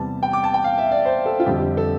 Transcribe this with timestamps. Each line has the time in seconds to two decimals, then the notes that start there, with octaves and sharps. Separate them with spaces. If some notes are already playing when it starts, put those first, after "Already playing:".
Already playing: E2 C3 G3 A5
0.23 G5
0.33 D6
0.44 A5
0.54 G5
0.64 F5
0.78 E5
0.91 D5
1.05 C5
1.26 A4
1.39 F4
1.46 F2 D3 G3 C4 G4
1.56 G4
1.77 A4